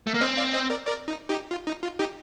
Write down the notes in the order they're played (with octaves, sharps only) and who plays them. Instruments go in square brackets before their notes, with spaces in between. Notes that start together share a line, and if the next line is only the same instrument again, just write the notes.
[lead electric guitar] A3
A#3
[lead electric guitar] C4 [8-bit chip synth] C5 D#5
[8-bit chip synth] D5 F5
C5 D#5
A#4 D5
A#4 D5
D#4
D#4 G4
F4
D#4
F4
D#4 G4